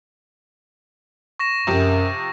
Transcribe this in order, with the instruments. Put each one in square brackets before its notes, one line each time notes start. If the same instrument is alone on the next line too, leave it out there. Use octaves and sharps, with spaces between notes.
[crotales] C#6 A#6 E7
[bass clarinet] F#2 [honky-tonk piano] C3 F3 G4